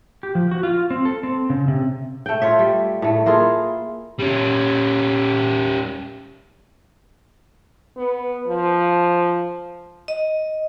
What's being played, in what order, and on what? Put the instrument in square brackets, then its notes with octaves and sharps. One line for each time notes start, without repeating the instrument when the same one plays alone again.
[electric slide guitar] G4
F3
F#4
F4
C4
A4
C4
C#3
C3
[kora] A3 G5
F4 C#5 E5
G3
A2 A3
A#3 E4 F4 G#4
[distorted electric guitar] G3 C#4
[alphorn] B3
F3
[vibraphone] D#5